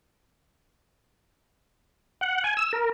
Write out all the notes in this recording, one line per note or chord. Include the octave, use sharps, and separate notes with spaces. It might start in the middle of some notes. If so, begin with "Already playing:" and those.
F#5
G#5
E6
A#4